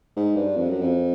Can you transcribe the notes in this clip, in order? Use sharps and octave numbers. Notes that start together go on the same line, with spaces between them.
G#2
G2
F2
F#2
F2